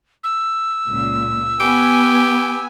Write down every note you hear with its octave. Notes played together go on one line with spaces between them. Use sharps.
E6
C#2 A#2
B3 G4 G#5